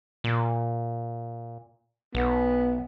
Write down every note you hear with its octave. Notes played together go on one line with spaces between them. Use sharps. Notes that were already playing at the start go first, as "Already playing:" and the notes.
A#2
B1 B3